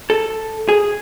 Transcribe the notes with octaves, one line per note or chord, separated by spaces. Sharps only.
A4
G#4